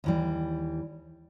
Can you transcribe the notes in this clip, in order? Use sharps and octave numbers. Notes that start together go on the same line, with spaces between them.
D#2 E3 G3